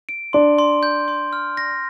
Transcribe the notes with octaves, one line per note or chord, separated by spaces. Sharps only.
D7
D4 C6
C6
G6
C6
F6
A#6